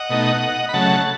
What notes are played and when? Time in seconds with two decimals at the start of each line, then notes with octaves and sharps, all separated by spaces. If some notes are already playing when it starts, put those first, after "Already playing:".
Already playing: D#5 F#5
0.10 B2 A3 D#4
0.69 B5
0.73 C#3 F#3 A3 F#5 A5